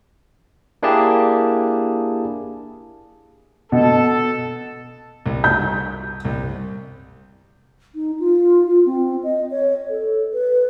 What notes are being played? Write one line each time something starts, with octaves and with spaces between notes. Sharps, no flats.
A#3 D4 E4 G4 G#4 A5
B2 A4
C2
G6
C2
D#4
F4
F4
C4
D#5
C#5
A4
B4